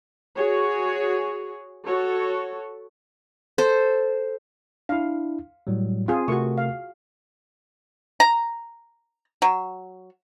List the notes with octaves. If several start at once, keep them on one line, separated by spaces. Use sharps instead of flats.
F#4 G#4 C#5
F#4 A4 C#5
A4 C5
D4 E4 F5
A2 F#3 G3
C4 F4 G#4
C3 A3 F#4 A#4 C#6
F5
A#5
F#3